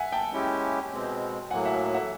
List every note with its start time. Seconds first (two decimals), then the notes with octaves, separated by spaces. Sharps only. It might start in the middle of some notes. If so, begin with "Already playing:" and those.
Already playing: E5 F#5 G#5
0.12 G5 A5
0.32 G#3 C#4 E4 G4
0.91 B2 G#3 C4
1.50 A2 F#3 A#3 F#5 G#5
1.65 E5 F#5
1.94 E5 F#5